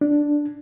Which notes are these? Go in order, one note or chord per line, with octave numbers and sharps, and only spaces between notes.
D4